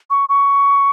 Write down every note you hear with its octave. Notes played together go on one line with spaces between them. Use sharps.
C#6
C#6